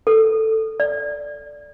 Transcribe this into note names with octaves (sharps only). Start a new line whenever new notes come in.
A4
D5